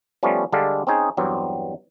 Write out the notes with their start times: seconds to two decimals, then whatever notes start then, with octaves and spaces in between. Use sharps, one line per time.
0.23 F3 G3 A3 B3 C#4
0.52 D3 G3 G#3 D4 A4 F5
0.87 C4 C#4 D#4 G#4
1.17 E2 G2 F#3 C4